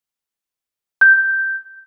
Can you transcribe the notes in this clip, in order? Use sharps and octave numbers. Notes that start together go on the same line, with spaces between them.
G6